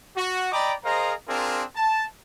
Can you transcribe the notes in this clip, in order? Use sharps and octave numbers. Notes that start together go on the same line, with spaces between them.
F#4
D5 D#5 G5 A#5 B5 D6
G#4 A#4 C5 D#5 F5 A#5
C4 D4 F4 G#4 A#4
A5